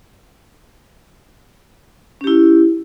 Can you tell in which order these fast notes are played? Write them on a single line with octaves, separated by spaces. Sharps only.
C#4 G4 E4